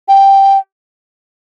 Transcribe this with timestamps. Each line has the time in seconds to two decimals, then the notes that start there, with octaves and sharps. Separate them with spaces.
0.08 G5